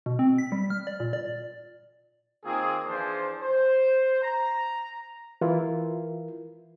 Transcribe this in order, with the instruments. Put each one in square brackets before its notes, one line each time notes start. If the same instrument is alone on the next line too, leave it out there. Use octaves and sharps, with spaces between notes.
[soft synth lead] B2
C4
B6
G3
F6
D5
A#2
D5
[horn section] D#3 A#3 C4 F4 G#4
E3 F3 D4 G#4 C5
C5
A#5
[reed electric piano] E3 E4 F4 A#4